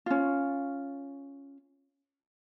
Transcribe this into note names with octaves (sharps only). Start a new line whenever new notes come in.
C#4 F4